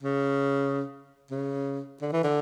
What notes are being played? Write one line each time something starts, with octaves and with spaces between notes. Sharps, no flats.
C#3
C#3
D3
E3
D3